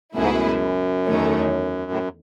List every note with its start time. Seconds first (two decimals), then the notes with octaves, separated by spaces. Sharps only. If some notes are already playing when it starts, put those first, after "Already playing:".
0.14 C#2 F#2 B2 A3 E4 G#4
0.22 G#2
0.31 F#2
1.07 E2 D#3 A3 C#4
1.91 A2